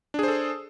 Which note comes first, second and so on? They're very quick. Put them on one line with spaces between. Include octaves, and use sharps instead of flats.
D4 G#4 C5 A4